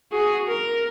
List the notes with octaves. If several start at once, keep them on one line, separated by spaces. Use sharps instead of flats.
F#4 G#4
A#4